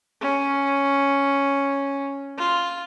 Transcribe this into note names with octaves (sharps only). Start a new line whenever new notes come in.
C#4
F4